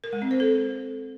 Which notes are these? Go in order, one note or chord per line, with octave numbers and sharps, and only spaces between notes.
A#4
G#3
C4
C5
A4